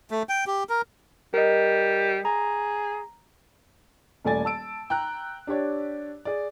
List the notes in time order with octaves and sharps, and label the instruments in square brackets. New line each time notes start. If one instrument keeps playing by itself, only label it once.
[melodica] A3
G5
G4
A#4
[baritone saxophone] G3 [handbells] A#4 D#5
[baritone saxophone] G#4 [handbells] A#5
[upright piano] D#1 A3 A4 D5 G#5 A6
A5 E6 D7
G5 A#5 F#6
D4 G4 C#5 D5
G#4 D5